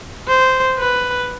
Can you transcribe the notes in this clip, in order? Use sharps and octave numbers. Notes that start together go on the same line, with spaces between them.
C5
B4